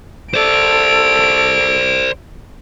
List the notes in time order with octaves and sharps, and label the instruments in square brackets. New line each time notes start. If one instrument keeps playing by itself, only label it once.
[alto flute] A4 [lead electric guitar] C5 D5 [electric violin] D7